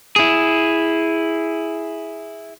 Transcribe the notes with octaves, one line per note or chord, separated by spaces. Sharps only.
E4 G#4